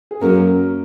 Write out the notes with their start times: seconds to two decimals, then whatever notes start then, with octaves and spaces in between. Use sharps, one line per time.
0.11 G#4
0.21 F#2 A#3 A#4